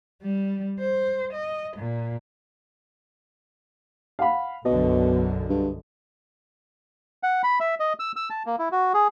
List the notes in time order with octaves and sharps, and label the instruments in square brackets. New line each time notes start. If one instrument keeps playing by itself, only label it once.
[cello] G3
C5
D#5
A#2
[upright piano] F5 F#5 B5
[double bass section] B1 F#2 D3 [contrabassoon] B2 [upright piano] D#5
[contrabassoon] G2
[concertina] F#5
B5
E5
D#5
E6
E6
A5
A#3
E4
F#4
G#4